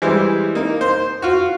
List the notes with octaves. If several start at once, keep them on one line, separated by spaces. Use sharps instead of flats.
E3 G3 G#3 E4 C5
A#3 D#4
C5 C6
F4 F#4